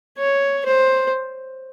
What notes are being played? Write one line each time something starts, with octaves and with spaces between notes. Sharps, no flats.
C#5
C5